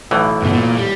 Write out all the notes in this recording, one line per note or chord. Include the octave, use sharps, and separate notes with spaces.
B1 A2 E3
G2 B2
A#2
G3